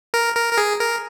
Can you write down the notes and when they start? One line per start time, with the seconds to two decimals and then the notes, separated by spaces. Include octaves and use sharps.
0.14 A#4
0.36 A#4
0.53 A#4
0.58 G#4
0.80 A#4